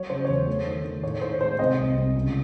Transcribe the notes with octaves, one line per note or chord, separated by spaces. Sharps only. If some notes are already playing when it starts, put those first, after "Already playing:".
Already playing: F#3 C#5
C#3 C5
C#5
E2 C5
A3
D#3
D#3
A2 C#5
A2 C5
G#3 C5
C3 D#5
C2
C2
C#2